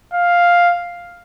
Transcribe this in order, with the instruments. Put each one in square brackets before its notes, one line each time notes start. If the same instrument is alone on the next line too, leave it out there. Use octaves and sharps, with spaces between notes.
[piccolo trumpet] F5